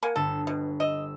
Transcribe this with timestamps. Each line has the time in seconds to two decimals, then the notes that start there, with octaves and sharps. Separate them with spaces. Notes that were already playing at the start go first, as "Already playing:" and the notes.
0.03 A#3 F#5 G#5
0.16 G1 A4
0.47 B2
0.80 D#5 E6